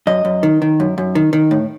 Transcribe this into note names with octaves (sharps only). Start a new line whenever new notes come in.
F#2 D#5
F#2
D#3
D#3
F#2
F#2
D#3
D#3
A2